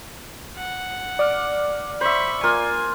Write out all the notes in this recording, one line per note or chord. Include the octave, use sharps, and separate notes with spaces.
F#5
D5 D6 F6
C5 E5 B5 C#6
A#3 F4 G#5